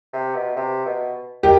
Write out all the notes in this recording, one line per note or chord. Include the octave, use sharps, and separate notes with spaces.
C3
B2
C3
B2
D#3 G4